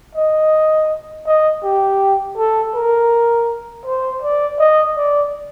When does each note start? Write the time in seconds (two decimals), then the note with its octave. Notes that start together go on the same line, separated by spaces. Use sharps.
0.15 D#5
1.26 D#5
1.64 G4
2.37 A4
2.75 A#4
3.85 C5
4.22 D5
4.60 D#5
4.96 D5